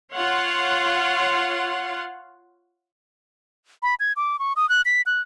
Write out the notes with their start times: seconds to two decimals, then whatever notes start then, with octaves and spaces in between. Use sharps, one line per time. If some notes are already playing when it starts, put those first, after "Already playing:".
0.13 F4 C#5 F5 F#5 C6
3.83 B5
4.00 G#6
4.17 D6
4.39 C#6
4.56 D#6
4.69 F#6
4.85 B6
5.06 F#6